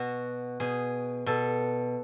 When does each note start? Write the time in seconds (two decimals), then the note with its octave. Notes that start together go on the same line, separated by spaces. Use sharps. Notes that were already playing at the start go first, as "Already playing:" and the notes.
Already playing: B2 F#4
0.60 B2 G#4
1.26 B2 A4